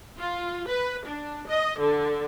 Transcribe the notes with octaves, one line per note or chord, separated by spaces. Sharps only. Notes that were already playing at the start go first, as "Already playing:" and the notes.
F4
B4
D4
D#5
D3